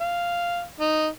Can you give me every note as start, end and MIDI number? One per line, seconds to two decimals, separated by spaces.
0.01 0.63 77
0.80 1.07 63